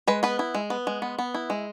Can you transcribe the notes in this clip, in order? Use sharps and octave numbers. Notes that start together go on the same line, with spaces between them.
G#3 B4
B3 B4
E4
G#3
B3
G#3
B3
B3
E4
G#3